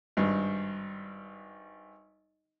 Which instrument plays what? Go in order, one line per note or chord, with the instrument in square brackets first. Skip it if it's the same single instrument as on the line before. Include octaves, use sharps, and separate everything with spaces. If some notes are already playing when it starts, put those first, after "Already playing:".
[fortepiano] G#1 G2